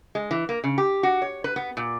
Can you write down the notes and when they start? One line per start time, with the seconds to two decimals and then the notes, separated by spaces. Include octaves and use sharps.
0.15 G#3
0.31 E3
0.49 A#3
0.64 C#3
0.78 G4
1.03 F#4
1.22 C#5
1.44 B4
1.56 B3
1.77 A#2